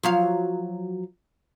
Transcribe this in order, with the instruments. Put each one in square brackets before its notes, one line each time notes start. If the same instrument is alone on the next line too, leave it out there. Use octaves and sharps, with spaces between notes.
[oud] F3 F#3 F5